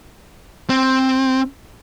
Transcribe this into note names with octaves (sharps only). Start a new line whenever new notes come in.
C4